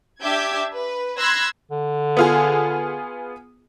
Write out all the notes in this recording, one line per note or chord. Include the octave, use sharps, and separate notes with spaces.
D4 G4 E5 D6 G6 G#6
B4
B5 C6 E6 F#6 G#6 A#6
D3
B3 F4 G#4